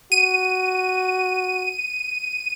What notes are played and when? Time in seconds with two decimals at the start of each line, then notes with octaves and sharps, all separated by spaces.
0.12 F#4 D#7